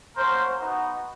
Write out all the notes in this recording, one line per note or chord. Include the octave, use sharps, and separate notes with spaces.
A#3 C#4 F#4 A#4 C5
B3 D#4 F#4